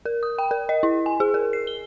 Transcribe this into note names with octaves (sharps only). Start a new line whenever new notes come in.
A#4
D#6
G5
A#4
D#5
E4
G#5
G#4
A#4
C7
G7